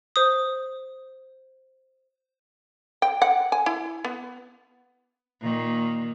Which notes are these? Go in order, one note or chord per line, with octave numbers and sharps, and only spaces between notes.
C5 D#6
G5
F#5
G#5
E4
B3
A#2 D#3 A#3